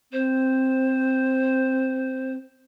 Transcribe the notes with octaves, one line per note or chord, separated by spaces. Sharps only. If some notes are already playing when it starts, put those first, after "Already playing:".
C4 C5